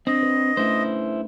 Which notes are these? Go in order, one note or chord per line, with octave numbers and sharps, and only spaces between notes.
C4 D4 D#5
B4
A3 C#4 E4 B4 C5